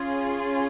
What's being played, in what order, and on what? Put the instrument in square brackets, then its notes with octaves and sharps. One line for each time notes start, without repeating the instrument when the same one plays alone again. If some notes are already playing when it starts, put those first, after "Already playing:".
Already playing: [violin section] C#4 F4 G#4